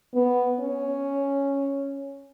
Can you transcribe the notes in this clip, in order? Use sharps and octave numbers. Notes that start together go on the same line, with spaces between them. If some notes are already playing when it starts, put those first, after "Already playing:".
B3
C#4